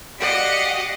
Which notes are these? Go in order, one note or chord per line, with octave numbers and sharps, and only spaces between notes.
F#4 G4 D5 D#5 F5 F#5